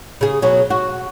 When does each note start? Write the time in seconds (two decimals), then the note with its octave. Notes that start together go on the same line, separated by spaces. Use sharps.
0.21 C#3 G#4
0.42 B2 F#3 C#4
0.70 F#4